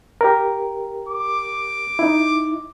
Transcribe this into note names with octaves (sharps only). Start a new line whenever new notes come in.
G4 A#4
D6
D#4 E4